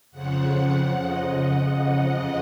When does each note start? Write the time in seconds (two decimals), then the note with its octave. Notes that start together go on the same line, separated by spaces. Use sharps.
0.11 F2 C#3 F3 F#5
0.58 F#5
1.04 D#5